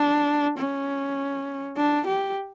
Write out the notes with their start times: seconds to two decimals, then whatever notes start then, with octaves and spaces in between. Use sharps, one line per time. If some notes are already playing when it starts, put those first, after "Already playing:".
Already playing: D4
0.58 C#4
1.77 D4
2.06 G4